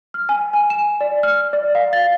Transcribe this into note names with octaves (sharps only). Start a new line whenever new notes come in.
F6
G#5
G#5
E7
D5
F6
D5
F5
A6